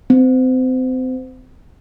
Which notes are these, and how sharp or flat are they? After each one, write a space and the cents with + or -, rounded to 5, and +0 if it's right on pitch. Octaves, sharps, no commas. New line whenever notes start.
C4 -30